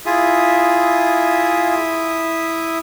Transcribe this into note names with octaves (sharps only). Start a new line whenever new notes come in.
E4 F4 G#4 E5 D#6